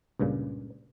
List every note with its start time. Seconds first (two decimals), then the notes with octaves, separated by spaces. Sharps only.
0.20 C#2 G2 A#2 C#3